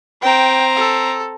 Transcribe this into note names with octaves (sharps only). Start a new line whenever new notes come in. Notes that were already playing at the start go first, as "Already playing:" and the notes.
C4 G5 A#5
A4